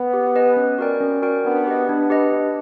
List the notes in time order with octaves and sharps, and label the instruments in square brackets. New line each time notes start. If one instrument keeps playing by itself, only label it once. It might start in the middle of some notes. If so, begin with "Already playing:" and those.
Already playing: [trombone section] B3
[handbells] G4
B4 D#5 G#5
C#4
F#4 A#4 D5 G5
C#4
F#4 A#4 D5 G5
[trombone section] B3 [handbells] D4
[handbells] G4 B4 D#5
[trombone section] B3 [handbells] D4
[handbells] G4 B4 D#5
D4